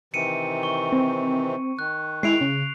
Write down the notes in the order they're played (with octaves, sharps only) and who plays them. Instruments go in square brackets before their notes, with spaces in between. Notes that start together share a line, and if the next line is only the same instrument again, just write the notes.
[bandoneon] C3 D#3 E3 [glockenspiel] C#7 D#7
[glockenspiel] C#6
[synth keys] C4
[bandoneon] D#3 [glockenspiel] F#6
[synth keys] G#3 E4 [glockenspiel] C7 D7 F7
[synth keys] C#3